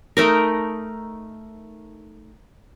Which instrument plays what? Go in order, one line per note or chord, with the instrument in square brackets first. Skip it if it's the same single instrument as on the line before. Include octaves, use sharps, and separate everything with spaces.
[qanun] A3 D#4 A#4